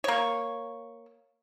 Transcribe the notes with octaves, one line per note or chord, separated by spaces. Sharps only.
A#3 C#5